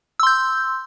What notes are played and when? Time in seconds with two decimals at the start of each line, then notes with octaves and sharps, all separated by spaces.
0.20 E6
0.23 C6
0.27 G6